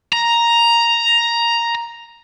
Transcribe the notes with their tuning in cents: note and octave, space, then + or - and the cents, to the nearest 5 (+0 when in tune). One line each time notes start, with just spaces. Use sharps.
A#5 +5